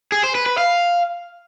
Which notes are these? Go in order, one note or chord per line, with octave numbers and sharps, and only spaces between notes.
G#4
C5
B4
B4
F5